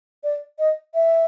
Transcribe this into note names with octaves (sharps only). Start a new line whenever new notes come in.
D5
D#5
E5